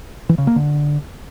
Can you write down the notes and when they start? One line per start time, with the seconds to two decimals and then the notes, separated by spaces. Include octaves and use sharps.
0.29 E3
0.38 C#3
0.47 A#3
0.56 D3